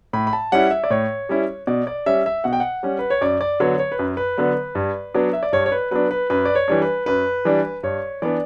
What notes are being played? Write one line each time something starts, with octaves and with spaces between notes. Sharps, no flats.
A2 B5
B5
A5
G3 C#4 E4 F#5
E5
D5
A2 C#5
G3 C#4 E4
B2 D5
D5
G3 C#4 E5
E5
B2 F#5
G5
F#5
G3 C#4
B4
C#5
F#2 D5
D5
D3 F#3 B3 C#5
C#5
B4
F#2
B4
D3 F#3 B3
G2
F#3 B3 D4
E5
D5
G2 C#5
C#5
B4
F#3 B3 D4 B4
B4
F#2 B4
D5
C#5
E3 G3 D4
B4
F#2 B4
E3 G3 D4
G2 C#5
E3 B3 D4 D5